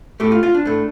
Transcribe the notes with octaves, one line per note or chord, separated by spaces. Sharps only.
A2 A3 G4
F4
F4
D4
A2 A3